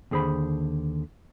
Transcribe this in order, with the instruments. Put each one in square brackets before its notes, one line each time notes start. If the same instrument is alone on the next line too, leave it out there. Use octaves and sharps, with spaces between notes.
[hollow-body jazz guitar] D#2 D3 G#4 C5 B5